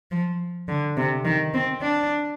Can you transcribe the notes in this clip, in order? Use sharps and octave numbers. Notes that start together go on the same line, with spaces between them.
F3
D3
C3
D#3
C4
D4